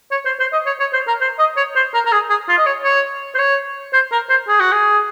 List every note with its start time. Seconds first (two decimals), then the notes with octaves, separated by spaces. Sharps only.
0.11 C#5
0.25 C5
0.40 C5
0.52 D#5
0.66 C#5
0.79 C#5
0.93 C5
1.08 A#4
1.21 C5
1.39 D#5
1.57 C#5
1.76 C5
1.94 A#4
2.06 A#4
2.12 G#4
2.30 G#4
2.49 F4
2.58 D#5
2.66 C#5
2.84 C#5
3.35 C5
3.39 C#5
3.93 C5
4.12 A#4
4.29 C5
4.48 G#4
4.60 F#4
4.72 G#4